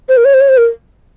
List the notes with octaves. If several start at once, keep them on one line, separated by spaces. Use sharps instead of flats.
C5
A#4
C#5
C5
C#5
C5
A#4